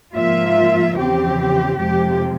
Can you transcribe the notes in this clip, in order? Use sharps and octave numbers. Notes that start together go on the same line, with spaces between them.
G#2 F3 A#3 F4 E5
E2 C#3 F3 C4 G4
F2 C3 F3 G#3 G4